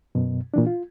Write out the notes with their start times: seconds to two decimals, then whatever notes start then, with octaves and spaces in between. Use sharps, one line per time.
0.15 F#2 B2
0.54 A#2 E3 D4
0.67 F4